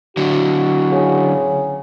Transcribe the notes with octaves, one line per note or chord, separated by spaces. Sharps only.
D3 F#3 F#4
C#3